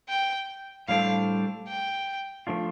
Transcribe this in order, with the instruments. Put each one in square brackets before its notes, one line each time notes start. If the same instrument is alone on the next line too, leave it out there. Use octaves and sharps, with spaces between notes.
[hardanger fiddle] G5
[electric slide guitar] A2 G3 D4 A4 C5 [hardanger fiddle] F5
[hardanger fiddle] G5
[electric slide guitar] F3 A3 D4 F4